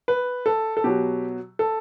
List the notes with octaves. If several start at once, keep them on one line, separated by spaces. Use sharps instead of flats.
B4
A4
A4
B2 F#3 G4
A4